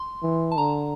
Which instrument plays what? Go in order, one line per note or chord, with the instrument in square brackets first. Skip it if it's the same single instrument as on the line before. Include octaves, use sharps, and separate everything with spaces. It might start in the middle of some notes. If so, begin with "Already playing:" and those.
Already playing: [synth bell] C6
[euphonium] E3
[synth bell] A5
[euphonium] D3 [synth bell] A#5